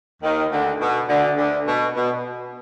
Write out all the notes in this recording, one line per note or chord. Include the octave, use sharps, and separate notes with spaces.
D#2 D#3
D2 D3
B2
D2 D3
D2 D3
B2
B2